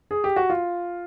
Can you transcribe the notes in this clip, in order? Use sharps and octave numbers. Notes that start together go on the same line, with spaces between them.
G#4
G4
F#4
F4